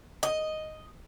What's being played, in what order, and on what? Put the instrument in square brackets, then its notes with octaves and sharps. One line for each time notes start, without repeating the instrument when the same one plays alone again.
[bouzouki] D#5